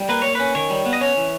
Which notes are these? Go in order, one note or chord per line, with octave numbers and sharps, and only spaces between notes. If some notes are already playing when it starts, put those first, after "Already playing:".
Already playing: G3
A#3 B4
A#3 C#5
C#4 B4
D#3 C#5
G3
B3
D#5
C#4 C#5
E3